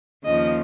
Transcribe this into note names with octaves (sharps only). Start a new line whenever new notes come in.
D#2 C#3 F3 D#5